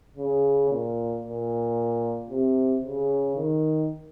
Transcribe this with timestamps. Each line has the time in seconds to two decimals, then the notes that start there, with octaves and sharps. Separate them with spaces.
0.17 C#3
0.70 A#2
1.23 A#2
2.30 C3
2.84 C#3
3.36 D#3